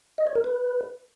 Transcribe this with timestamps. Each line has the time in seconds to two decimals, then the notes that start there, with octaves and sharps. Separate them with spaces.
0.18 D#5
0.27 C#5
0.36 A#4
0.44 B4